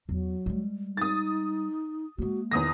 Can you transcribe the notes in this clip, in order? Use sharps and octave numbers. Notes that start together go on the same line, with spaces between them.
E2 F#3
G3 G#3
D#4 D#6 A6
G#3 A#3 F#4
E2 D#3 D#6 A#6